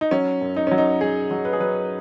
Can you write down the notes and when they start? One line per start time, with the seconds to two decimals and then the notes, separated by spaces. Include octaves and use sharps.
0.01 D#4
0.11 F#3 C#4
0.41 F#2
0.56 D#4
0.67 F#3 C#4
0.78 D#4
1.01 F#3 G#4
1.31 F#3
1.45 B4
1.53 G#4
1.60 F#3 B4